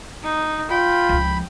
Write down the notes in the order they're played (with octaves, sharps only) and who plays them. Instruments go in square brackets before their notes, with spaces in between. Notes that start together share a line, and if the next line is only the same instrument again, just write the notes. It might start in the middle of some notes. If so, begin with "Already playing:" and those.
[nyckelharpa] D#4
[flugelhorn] F4 [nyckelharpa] G5 [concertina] B5
[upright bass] C#2 F3